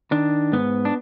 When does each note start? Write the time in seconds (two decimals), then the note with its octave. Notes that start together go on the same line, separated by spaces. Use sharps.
0.11 D#3 D4
0.52 G#2 B3
0.85 D4